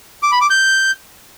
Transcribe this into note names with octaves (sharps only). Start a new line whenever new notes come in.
D6
B5
D6
G6